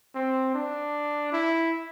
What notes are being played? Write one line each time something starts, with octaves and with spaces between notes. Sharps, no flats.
C4
D4
E4